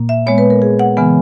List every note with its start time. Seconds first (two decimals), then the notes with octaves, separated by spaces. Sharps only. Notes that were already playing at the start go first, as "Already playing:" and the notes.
Already playing: A#2 A#3
0.09 E5
0.27 A#2 G#3 B3 C#5
0.38 B4
0.50 A#4
0.62 G#4
0.79 F#5
0.97 C#3 E3 G#3 B3 G#5